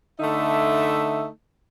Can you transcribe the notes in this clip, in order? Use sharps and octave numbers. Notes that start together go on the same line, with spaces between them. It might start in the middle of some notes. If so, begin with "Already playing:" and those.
D3 A3 D#4 E5